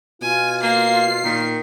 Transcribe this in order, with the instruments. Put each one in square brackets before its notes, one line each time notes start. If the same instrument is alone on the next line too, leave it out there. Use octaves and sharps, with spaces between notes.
[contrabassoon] B2 [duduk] F4 [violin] G#5
[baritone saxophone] A#3 [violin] C7
[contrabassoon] A#2 [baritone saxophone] D#3